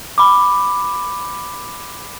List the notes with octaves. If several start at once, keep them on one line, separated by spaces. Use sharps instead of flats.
B5 D6